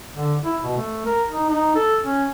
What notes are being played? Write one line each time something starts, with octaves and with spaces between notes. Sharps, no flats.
D3
E4
B2
A3
A#4
D#4
D#4
A4
C#4